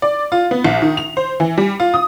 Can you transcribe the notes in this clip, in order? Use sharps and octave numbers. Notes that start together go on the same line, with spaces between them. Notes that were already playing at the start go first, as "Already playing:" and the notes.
D5
F4
B3
A#1
D#3
F7
C5
E3
G3
F4
D#6